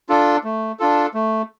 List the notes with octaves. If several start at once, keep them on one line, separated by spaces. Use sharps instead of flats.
D4 F4 A4
A3
D4 F4 A4
A3